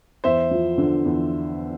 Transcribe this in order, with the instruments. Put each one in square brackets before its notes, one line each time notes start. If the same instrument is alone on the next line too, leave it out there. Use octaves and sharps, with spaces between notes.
[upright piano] E2 [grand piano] C5 E5
[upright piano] F3
D3
E2